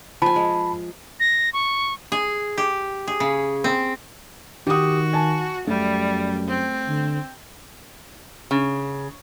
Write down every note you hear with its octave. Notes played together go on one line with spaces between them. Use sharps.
F3 G#5 A5 B5
G#3
A#6
C#6
G#4
G4
G#4
C#3
C4
D#3 F#4 G4 D#6
G#5 A5
F#2 G3 A3
C4
D3
C#3